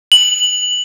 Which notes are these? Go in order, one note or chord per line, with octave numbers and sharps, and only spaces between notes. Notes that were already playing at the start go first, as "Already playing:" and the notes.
F#7